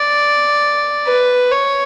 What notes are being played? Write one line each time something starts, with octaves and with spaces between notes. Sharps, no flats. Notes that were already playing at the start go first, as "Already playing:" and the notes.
Already playing: D5
B4
C#5